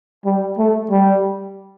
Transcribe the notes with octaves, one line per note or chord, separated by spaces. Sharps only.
G3
A3
G3